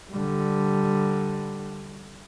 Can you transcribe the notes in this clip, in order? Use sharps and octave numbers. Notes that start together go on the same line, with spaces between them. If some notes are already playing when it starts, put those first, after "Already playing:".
D3 G3